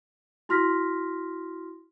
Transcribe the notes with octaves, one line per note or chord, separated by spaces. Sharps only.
E4 F#4 C6 F6 A#6 B6